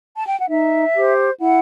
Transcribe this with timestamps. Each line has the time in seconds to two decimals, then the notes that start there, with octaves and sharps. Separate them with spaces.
0.15 A5
0.26 G5
0.39 F#5
0.50 D#4 E5
0.95 G4 C5
1.40 E4 F#5